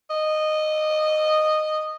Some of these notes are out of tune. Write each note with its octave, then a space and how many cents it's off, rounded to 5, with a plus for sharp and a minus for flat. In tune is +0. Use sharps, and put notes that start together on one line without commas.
D#5 -15